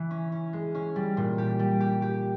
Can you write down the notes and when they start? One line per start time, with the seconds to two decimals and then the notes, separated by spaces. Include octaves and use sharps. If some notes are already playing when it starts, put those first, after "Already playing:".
Already playing: E3
0.11 C#4
0.32 C#4
0.53 G#3
0.75 C#4
0.96 G3
1.17 A#2
1.38 G4
1.59 G3
1.80 G4
2.02 G4